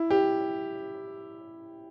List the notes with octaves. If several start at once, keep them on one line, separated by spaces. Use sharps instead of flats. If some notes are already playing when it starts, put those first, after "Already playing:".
Already playing: E4
G4